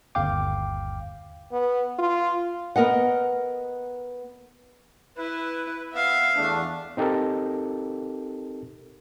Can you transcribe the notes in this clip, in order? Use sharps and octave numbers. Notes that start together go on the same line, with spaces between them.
G1 D#2 F5 G5 D6
B3
F4
B3 A#4 D#5 F#5
E4 B4
B3 E5 F5
E2 A3 D4
C4 D#4 G4 A4 A#4